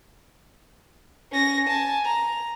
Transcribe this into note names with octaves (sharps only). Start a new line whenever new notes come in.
C#4 A#6
G#5 A5
A#5